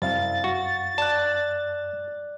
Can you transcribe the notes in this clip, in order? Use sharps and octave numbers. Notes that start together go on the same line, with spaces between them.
C2 F#2 F5 A6
F#4
D5 A5 F#6